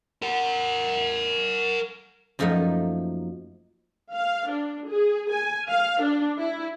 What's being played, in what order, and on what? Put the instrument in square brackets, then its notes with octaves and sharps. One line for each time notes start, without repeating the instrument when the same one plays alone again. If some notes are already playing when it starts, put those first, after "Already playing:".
[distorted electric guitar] A#4 F#5
[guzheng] F#2 F3 A3 A#3 D#4
[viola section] F5
D4
G#4
G#5
F5
D4
E4